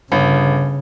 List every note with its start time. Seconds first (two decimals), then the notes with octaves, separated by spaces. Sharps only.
0.12 G1 C#3